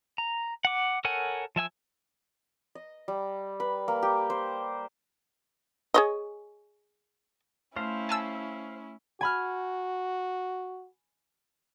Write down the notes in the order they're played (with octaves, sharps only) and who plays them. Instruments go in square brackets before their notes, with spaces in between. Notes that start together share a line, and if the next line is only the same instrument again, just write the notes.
[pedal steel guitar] A#5
F#5 D6
A4 A#4 C#5 F#5 G#5
F3 E5 G#5 E6
[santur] D#5
G3
B4
A#3
G4
C5
[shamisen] G#4 C#5 D#5
[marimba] A3 [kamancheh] C#4 E4 [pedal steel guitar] C5 F5 C6
[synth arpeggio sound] G#5 A5 E6
[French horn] F#4 [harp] G#5 B5 F6